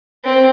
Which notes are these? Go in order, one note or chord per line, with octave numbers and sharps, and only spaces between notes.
C4